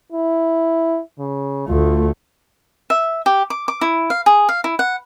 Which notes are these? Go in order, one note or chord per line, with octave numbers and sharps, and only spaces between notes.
E4
C#3
D2 A3 F4
E5
G4
D6
D6
E4
F5
G#4
F5
E4
F#5